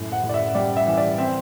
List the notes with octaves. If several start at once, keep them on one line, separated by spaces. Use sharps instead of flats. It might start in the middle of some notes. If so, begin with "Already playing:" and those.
Already playing: F#2 A2
F#5
A2
D5
E5
G3 D5
E5
E3
D5
C4 E5